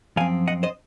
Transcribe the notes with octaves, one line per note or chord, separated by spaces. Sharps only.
F#2 F3 C4 F5 G#5
D#5 F#5
C5 D#5